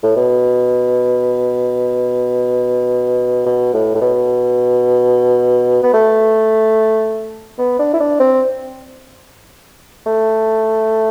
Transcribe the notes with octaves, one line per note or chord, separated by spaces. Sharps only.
A2
B2
B2
A2
A2
B2
B3
A3
B3
D4
E4
D4
C4
A3